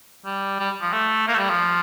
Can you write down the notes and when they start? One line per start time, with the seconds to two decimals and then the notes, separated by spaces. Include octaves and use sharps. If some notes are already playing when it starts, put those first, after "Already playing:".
0.25 G3
0.59 G3
0.81 F3
0.93 A3
1.28 A#3
1.34 A3
1.38 G3
1.50 F3